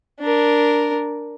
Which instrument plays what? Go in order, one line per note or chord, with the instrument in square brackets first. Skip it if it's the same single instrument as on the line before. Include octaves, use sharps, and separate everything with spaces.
[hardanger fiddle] D4 A#4